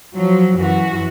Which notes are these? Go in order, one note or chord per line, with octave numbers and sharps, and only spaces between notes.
F3 F#3
F#2 E3 F#4